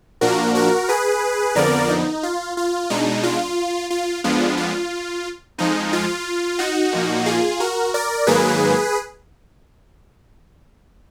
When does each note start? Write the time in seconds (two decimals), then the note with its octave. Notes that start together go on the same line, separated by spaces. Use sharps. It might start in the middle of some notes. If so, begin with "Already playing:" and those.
0.21 A#2 F3 A#3 D4 F#4 A#4
0.55 F#4 A#4
0.89 G#4 B4
1.55 F2 D3 F3 B3 A#4 D5
1.90 D#4
2.23 F4
2.57 F4
2.90 B2 G#3 D4 D#4
3.23 F4
3.90 F4
4.24 F2 F3 G#3 B3 D4 F4
4.57 F4
5.58 F2 F3 G#3 D#4
5.93 F4
6.59 D#4 F#4
6.93 A#2 F3 A#3
7.26 F4 G#4
7.60 F#4 A#4
7.94 A#4 D5
8.27 G#2 D#3 F#3 A#3 G#4 B4